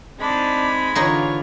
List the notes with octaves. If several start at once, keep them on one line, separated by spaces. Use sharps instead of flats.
G#3 C4 D4 D#4 B5
D3 E3 D#4 F4 G#4 C#5